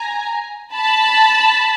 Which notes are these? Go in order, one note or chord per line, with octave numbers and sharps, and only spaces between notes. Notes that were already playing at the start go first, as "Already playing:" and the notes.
Already playing: G#5 A#5
A5 B5